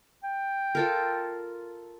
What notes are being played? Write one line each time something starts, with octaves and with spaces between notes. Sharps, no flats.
G5
F4 A4 A#4